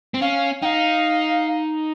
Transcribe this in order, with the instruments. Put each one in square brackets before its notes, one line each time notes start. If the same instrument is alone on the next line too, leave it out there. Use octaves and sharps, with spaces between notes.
[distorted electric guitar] C4
[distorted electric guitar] C#4 [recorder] F5
[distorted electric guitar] D#4 [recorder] F5 G5